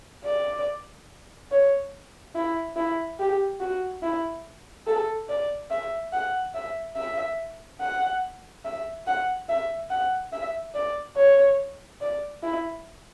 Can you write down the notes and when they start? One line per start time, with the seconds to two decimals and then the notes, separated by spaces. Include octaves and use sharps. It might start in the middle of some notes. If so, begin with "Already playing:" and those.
0.24 D5
1.51 C#5
2.35 E4
2.76 E4
3.19 G4
3.60 F#4
4.02 E4
4.87 A4
5.28 D5
5.70 E5
6.12 F#5
6.54 E5
6.96 E5
7.81 F#5
8.64 E5
9.06 F#5
9.48 E5
9.90 F#5
10.32 E5
10.74 D5
11.16 C#5
12.01 D5
12.42 E4